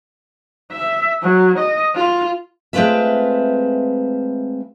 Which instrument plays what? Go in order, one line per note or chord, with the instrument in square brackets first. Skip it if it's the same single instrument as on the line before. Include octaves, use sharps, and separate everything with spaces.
[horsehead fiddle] E5
F#3
D#5
F4
[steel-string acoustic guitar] G#3 A3 C4 F4 B4 E5